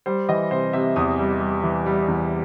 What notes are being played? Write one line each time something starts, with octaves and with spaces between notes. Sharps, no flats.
G3 C5
E3 D#5
C3 C5
C3 E5
E2 D#6
G3
G3
E3
G3
E2